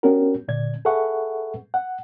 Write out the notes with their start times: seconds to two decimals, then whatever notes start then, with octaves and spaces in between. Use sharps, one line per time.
0.03 B3 C#4 D4 F#4 G4 A#4
0.48 A#2 D3 D5 G#6
0.85 G#4 A4 B4 E5 F#5 C#6
1.74 F#5